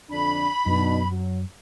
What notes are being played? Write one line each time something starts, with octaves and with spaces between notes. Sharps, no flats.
F2 D3 D4 B5
F#2 B2 D4 D#4
F#3